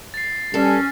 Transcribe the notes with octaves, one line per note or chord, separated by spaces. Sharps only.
A6 C7
G2 G3 C#4 A4